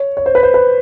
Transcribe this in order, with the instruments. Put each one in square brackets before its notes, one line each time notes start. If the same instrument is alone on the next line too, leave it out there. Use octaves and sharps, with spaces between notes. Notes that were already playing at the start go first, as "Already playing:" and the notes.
Already playing: [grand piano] C#5
C#5
C5
B4
C5
B4